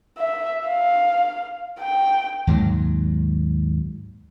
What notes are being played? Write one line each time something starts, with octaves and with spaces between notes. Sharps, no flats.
E5
F5
G5
D#2 G#2 F#3